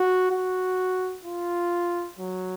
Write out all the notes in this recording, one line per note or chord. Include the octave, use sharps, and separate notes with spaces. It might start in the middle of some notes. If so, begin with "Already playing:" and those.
Already playing: F#4
F#4
F4
F#3